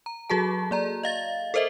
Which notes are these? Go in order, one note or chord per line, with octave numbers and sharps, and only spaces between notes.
A#5
F#3 F#4 G#4 A4 A5
A#3 D5 A#5
D#5 F5 A6
A4 A#4 C5 D#5 E5